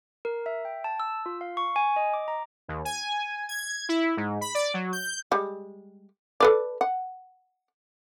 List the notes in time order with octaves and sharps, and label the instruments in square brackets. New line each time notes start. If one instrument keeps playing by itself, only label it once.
[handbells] A#4
E5
G5
A5
E6
F4
F5
C#6
G#5
D#5
D6
A#5
[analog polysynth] D#2
G#5
G#6
E4
G#2
B5
D5
F#3
G6
[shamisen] G3 G#3
A4 B4 D5
F#5